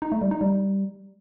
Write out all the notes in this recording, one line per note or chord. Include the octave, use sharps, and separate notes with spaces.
D#4
A3
G3
D#4
G3